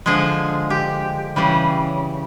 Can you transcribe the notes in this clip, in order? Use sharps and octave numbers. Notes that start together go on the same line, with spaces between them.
D3 F3 G#3 G#4
G4
C#3 E3 G3